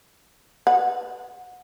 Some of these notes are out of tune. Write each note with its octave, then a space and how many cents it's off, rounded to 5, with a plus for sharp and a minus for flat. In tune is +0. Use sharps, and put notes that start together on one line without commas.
B4 +0 F#5 -30